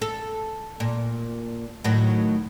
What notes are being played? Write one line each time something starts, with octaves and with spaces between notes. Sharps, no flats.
A4
A#2
A2 D#3 F#3